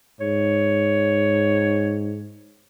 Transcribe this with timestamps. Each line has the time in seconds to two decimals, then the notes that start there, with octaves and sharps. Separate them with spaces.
0.20 G#2 C#5